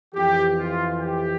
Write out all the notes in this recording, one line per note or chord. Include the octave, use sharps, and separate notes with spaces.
F2 E3 G4
F4
G4